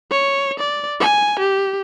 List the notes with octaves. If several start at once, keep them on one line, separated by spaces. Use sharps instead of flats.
C#5
D5
G#5
G4